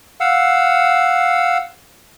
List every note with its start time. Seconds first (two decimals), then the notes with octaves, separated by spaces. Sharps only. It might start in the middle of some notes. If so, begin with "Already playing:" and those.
0.20 F5 F#5 E6